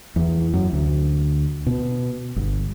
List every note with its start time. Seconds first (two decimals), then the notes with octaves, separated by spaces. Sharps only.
0.16 E2
0.53 F#2
0.73 D2
1.66 B2
2.36 G1